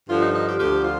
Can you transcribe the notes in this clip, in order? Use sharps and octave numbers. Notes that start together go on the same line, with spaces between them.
G2 D3 F3 F4
D#4
D#4
G4
D2 D3 F3 G4
F4